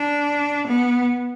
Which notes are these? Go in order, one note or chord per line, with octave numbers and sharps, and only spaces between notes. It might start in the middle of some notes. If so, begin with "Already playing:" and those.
Already playing: D4
B3